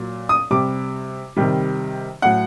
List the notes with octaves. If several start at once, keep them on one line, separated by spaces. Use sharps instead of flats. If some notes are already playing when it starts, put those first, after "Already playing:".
Already playing: A#2 F#3
D#6
C3 G3 D6
C3 D#3 G3
A2 F#3 F#5